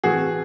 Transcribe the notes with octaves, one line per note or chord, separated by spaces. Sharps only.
A2 E3 A3 F#4 G#4